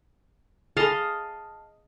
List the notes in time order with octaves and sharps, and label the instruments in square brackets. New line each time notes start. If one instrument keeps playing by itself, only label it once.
[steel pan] G#4 A4 B5 [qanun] D#5 F5 A5